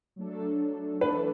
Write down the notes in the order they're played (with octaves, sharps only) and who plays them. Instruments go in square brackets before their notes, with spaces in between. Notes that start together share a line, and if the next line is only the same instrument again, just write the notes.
[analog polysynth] F#3 A3 D4 A4
[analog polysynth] E3 A3 D4 A4 [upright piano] B4